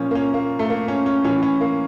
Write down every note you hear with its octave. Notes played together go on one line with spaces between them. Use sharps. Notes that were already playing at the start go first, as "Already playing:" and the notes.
Already playing: A#2 F3 C#4
A#3
C#4
A#3
A3
A#3
C#4
C#4
A2 E3 C#4
C#4
A#3